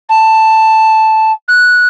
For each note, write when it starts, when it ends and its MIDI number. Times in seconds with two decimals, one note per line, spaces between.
0.09 1.32 81
1.48 1.88 90